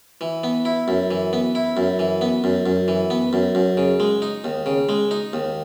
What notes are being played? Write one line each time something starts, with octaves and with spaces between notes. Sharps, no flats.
E3
B3
E4
F#2
E3
B3
E4
F#2
E3
B3
F#2
F#2
E3
B3
F#2
F#2
C#3
G#3
D#4
D#2
C#3
G#3
D#4
D#2